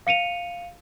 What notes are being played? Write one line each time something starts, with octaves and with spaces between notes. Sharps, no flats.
F5 C#7 D#7 F7